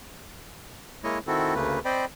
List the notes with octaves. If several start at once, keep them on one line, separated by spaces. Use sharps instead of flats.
G#3 A#3 E4 C#5 D#5
D#3 C4 E4 F#4 A4
D2 C#3 A3 A#3 B4
C4 C5 D5 D#5 G5 B5